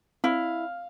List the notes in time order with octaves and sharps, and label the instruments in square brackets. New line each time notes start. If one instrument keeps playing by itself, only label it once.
[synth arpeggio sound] C4 [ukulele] E4 [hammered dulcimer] F5